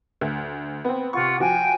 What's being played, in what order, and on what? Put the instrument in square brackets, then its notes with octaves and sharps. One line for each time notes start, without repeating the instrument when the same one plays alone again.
[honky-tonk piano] D2
B3 C4
[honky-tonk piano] C3 C#6 [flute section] F4 F#5
[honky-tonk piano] F3 F#4 [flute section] G5 G#5